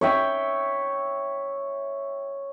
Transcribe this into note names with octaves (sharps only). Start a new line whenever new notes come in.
C#5 E5 G5